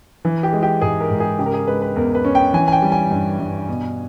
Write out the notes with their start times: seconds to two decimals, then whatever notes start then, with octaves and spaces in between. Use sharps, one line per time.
0.25 E3
0.43 G4
0.53 G#3
0.63 G4
0.81 G#2 G#4
1.01 A#4
1.10 G#2
1.20 G#4
1.39 C#3 G4
1.46 A#4
1.53 G#4
1.67 G#3 B4
1.82 B4
1.96 E2 A#4
2.15 B4
2.25 C#4
2.35 G5
2.53 E3 G#5
2.68 G#5
2.72 G5
2.82 G3
2.92 G#5
3.11 G2
3.39 G2
3.68 B2